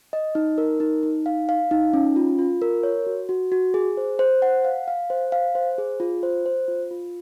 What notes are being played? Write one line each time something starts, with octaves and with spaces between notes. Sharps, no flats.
D#5
D#4
A#4
D#4
D#4
F5
F5
D#4
C#4
F4
F4
A#4
C#5
F#4
F#4
F#4
G#4
C5
C5
F#5
F5
F5
C5
F5
C5
G#4
F4
C5
C5
F4
F4